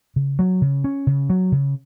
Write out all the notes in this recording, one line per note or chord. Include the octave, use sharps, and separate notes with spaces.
C#3
F#3
C#3
C#4
C#3
F#3
C#3